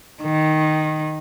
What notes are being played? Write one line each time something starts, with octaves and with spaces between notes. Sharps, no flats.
D#3